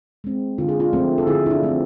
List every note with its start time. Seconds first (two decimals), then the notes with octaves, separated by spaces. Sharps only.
0.24 G#3 C4
0.58 D3 F4
0.69 G#4
0.80 D4 F4
0.93 F3 A3 C4
1.18 A4
1.27 D3 E4 G#4
1.46 E4
1.50 D4 F4
1.62 F3 A3 C4